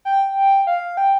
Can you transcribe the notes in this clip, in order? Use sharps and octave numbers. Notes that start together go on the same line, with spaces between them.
G5
F5
G5